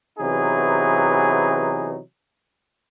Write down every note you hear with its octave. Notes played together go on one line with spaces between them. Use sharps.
C3 E3 F#3 B3 D#4 G#4